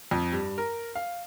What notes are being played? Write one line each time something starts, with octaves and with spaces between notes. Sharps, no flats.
F2
G2
A#4
F5